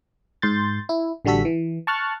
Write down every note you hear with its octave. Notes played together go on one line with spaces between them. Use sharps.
G#2 C6 G6 A6
E4
A1 D3 G3 F#4 A4 B6
E3
A5 C#6 F6 F#6 A6